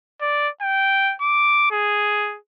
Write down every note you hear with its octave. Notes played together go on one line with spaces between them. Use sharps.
D5
G5
D6
G#4